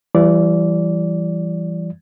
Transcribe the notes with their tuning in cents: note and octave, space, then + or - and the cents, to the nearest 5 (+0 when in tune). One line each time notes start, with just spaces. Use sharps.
E3 +35 G3 +0 D5 -15